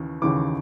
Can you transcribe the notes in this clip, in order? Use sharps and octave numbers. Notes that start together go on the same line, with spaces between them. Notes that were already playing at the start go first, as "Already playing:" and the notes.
Already playing: D#2 C#3 E3
D#2 C#3 E3 D6